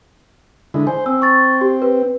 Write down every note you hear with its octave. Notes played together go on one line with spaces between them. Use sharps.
D3 G#3 E4
C5 G#5
C4 E6
C#6 A6
G4
B4